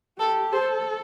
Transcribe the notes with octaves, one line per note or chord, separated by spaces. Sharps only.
G4 A4
A4 C5